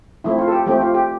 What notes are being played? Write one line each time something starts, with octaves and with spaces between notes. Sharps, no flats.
F3 A3 C4 E4
F4
A4
G4
F3 A3 C4 G4
F4
G4